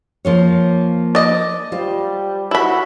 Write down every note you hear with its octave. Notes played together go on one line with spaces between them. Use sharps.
F3 A#3 C#5
D5 D#5
G3 F4 C5
E4 F#4 B5